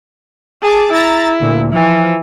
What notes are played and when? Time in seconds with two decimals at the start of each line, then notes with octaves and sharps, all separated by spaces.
0.62 G#4 A5 D6
0.92 E4 A#5 A6
1.40 D2 A#2
1.72 E3 F3